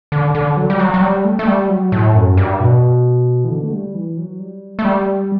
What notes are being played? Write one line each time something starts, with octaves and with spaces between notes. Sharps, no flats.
D3
D3
F#3
G3
F#3
F#3
G3
A3
A3
G3
F#3
A2
F#2
G2
B2
E3
D3
A3
G3
E3
F#3
G3
A3
G3